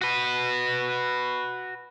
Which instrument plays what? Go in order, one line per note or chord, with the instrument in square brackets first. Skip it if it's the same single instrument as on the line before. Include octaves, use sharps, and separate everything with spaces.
[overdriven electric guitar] F#4 B4